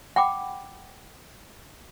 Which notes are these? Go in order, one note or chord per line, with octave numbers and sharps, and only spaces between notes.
F#5 G5 B5 D6